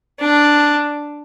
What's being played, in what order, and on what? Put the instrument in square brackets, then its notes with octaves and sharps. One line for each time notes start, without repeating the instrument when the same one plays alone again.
[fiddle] D4